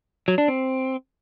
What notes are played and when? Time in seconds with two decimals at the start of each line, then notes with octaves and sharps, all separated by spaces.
0.28 F#3
0.38 D4
0.48 C4